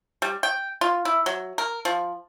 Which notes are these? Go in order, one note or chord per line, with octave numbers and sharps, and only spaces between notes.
G3
G5
F4
E4
F#3
A#4
F3